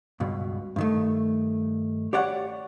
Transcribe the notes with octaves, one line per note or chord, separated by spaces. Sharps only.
C#2 G2 B2
G2 D#3 A3
G4 C#5 D5 F#5